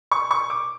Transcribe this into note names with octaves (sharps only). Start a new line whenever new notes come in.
C#6
C#6
D6